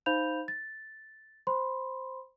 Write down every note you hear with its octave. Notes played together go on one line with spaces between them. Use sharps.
D#4 C5 F5 B5 G6 F7
A6
C5 B5 C6